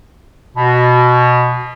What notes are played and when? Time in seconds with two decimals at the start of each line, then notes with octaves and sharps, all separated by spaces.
0.56 B2